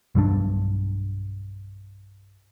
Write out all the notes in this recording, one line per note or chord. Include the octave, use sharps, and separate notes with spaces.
B1 G2 G3 D4